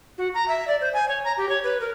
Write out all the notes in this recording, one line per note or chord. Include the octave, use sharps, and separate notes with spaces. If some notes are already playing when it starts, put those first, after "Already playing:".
F#4
A#5
E5
D5
C5
G#5
C#5
A#5
G4
C#5
B4
A#4